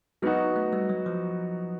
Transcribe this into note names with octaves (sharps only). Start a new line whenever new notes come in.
F#3 G#3 B3 D#4 F#4
A3
G3
F#3
F3